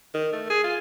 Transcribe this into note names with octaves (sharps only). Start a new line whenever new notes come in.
D#3
A3
G#4
F4